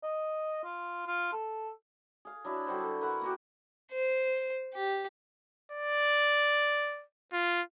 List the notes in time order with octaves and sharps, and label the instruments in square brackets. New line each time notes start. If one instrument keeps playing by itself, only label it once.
[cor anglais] D#5
F4
F4
A4
[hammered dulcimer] G#4 F5
F#3 D4 E4
D3 G3 F#4 C5
A4
A#4 B4 E5 F#5
A#3 F#4 G4
[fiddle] C5
G4
[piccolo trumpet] D5
F4